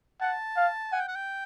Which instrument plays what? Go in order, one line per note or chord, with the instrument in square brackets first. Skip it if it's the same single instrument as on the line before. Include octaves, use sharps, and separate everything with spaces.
[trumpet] F#5 [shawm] A5
[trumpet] F5
[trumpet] F#5 [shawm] G#5
[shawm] G5
F#5
G5